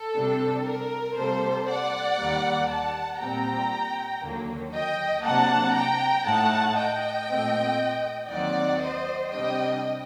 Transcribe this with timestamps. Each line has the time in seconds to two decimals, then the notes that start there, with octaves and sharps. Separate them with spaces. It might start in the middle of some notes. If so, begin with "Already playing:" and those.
Already playing: A4
0.15 C3 G3 D4
0.65 A#4
1.16 C3 G3 A#3 A4 C5
1.67 D5 F#5
2.18 D#2 D#3 G3 A#3
2.69 F#5 A5
3.20 A#2 G3 C4 G5 A#5
4.22 D#2 D3 F#3 A#3
4.72 D#5 G5
5.23 C3 F#3 A#3 D4 F#5 A5
5.75 G5 A#5
6.26 A2 A3 D#4 F#5 A5
6.77 D#5 G5
7.28 A#2 A3 C4
8.30 D#2 D#3 F#3 C4 D#4 D5 F#5
8.80 C5 D#5
9.31 C3 G3 D4 D#5 G5